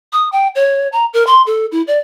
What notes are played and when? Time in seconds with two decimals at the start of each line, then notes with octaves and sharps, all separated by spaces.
0.13 D#6
0.32 G5
0.55 C#5
0.92 A#5
1.13 A#4
1.27 C6
1.46 A4
1.72 E4
1.87 D5